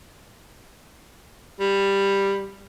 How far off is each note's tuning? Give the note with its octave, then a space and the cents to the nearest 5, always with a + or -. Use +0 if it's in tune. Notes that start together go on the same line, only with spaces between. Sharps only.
G3 +10